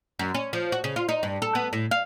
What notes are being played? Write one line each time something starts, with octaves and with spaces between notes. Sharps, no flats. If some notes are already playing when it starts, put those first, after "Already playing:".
F#2
C#4
F3
F#4
C#3
F4
D#4
G2
A4
B3
A2
F5